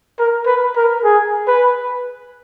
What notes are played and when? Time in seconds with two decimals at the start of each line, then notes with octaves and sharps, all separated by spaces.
0.19 A#4
0.46 B4
0.76 A#4
1.04 G#4
1.47 B4